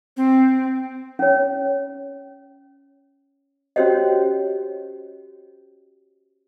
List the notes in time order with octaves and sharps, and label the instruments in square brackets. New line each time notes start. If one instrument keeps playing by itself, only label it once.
[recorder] C4
[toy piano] C#4 C#5
C#4 F#4 G4 C5 C#5 D#5